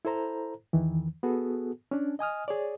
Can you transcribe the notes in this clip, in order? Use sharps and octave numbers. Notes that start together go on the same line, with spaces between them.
E4 A4 C5 A#5
E2 D#3 E3
B3 F#4 G#4 A4
C#4 D4
D#5 G#5 D#6 F6
G#4 C#5 D5